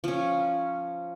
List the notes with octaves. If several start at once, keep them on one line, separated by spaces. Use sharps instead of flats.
F3 C#4